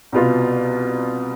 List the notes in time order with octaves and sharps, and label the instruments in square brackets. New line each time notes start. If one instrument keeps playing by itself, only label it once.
[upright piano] C2 B2 B3 F4